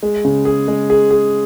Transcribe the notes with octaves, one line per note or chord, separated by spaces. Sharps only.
G#3
C#3
G#4
G#3
G#4
G#4